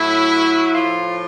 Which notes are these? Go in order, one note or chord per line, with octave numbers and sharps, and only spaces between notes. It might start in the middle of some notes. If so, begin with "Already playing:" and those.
Already playing: A2 F#3 E4
A2 F3 F4